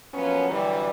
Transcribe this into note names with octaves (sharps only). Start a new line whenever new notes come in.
F3 F#3 A#3 B3 C#4
D3 E3 F#3 G3